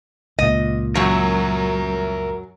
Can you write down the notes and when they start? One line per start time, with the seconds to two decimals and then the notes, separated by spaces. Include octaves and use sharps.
0.39 C#2 A#2 D#5
0.95 F#2 F#3 A#4 E5